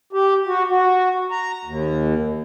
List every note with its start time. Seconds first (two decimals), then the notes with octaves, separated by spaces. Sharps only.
0.13 G4
0.47 F#4
0.70 F#4
1.31 A#5
1.65 D#2